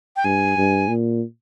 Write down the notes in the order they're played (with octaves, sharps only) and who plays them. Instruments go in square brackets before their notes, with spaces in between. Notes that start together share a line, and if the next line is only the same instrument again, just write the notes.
[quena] G5
[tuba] G2 [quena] G#5
[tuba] G2
A#2